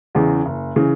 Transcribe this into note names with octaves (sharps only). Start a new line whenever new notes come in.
E2 C#3 E3
F#1
C#3 E3